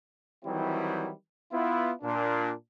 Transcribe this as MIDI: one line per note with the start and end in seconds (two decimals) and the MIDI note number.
0.44 1.10 51
0.44 1.10 52
0.44 1.10 54
0.44 1.10 55
0.44 1.10 60
0.44 1.10 64
1.52 1.92 59
1.52 1.92 64
1.52 1.92 65
2.02 2.52 46
2.02 2.52 62